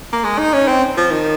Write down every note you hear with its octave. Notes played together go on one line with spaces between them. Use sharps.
A#3
G#3
D#4
C#4
C4
F3
D#3